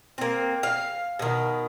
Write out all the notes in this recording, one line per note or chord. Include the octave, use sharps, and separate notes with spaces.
A#3 C4
F5
B2 D#3